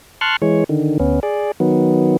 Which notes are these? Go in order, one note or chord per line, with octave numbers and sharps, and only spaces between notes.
A5 C6 C#6 F6 F#6
E3 G#3 C#5
D3 D#3
D2 B3 C#4
G#4 D5
D#3 F#3 B3